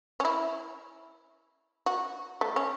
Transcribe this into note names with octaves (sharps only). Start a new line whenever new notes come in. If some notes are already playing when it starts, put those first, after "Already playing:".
C#4
E4
F#4
A3
C#4